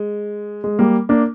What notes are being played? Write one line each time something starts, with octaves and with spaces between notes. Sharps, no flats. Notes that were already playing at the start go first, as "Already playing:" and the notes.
Already playing: G#3
G#3
G3 A#3
A#3 D4